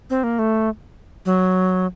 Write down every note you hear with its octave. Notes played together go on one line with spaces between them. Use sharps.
C4
A#3
A3
F#3